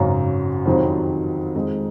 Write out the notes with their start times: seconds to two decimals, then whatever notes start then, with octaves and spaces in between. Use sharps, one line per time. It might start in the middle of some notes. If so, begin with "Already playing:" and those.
Already playing: G#1 F#2 C#3 F#3
0.65 F2 C3 D#3 F#3 C4
1.54 F2 D#3 G#3 D#4